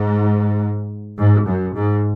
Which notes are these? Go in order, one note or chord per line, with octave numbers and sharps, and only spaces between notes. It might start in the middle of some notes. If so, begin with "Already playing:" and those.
Already playing: G#2
G#2
F#2
G#2